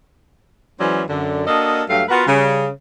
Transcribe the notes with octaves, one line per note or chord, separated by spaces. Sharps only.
E3 F#3 G#3 C#4 C5 D5
F#2 D3
A#3 D4 F#4 A4 D#5
G2 F#3 A3 F5
B3 F4 F#4 A#4 B4
C#3 G3